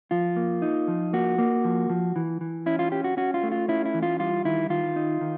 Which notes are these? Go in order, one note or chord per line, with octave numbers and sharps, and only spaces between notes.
F3 F4
A#3
D#4
F3
A#3 F#4
A#3
F3
F3
E3
E3
C#4 E4
F4
C#4 G4
F#4
C#4 F#4
F4
A3
F4
C#4 E4
E4
E3
F4
G3 F4
D#3 E4
D#3 F4
D#4
D#3